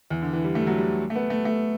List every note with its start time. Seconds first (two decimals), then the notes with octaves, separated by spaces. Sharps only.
0.10 E2
0.22 D3
0.33 E3
0.44 G3
0.55 A3
0.61 G3
0.67 F#3
0.78 G3
1.10 A3
1.16 B3
1.30 A3
1.45 A3